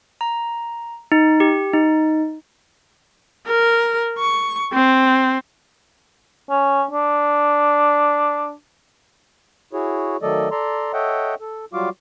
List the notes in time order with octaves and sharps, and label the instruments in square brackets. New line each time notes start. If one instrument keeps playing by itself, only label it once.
[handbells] A#5
D#4
G4
D#4
[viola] A#4
C#6
C4
[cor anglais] C#4
D4
[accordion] E4 F#4 G#4 C#5
D#3 F#3 A3 A4 D5 D#5
A4 D5 A#5 C6
A4 C#5 D#5 E5 F#5 G5
A4
F#3 G3 F4 F#4 F5 D6